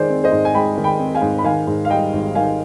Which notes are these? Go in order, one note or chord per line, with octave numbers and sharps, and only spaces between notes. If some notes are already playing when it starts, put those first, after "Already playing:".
Already playing: D#3 G#3 G#4 C5 D5
C4
C5 D#5
G#2
G#5
G#3 G5 B5
D#3
G5 B5
C4
F5 G#5
G#2
B5
D#3 F5 G#5
G#2
F5
G3 D#5 G5
G#1
D#3 F5 G#5